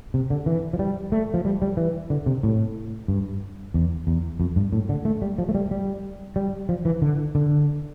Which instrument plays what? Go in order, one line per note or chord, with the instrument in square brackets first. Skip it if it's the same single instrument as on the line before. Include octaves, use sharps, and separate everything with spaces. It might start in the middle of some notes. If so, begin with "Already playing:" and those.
[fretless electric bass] C3
D3
E3
F3
G3
A3
F3
G3
G3
E3
D3
C3
A2
G2
E2
E2
F2
G2
A2
D3
A3
G3
F3
A3
G3
G3
G3
F3
E3
D3
D3